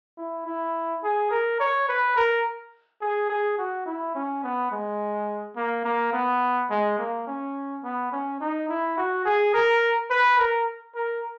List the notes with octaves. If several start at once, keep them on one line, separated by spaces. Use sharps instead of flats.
E4
E4
G#4
A#4
C#5
B4
A#4
G#4
G#4
F#4
E4
C#4
B3
G#3
A#3
A#3
B3
G#3
A#3
C#4
B3
C#4
D#4
E4
F#4
G#4
A#4
B4
A#4
A#4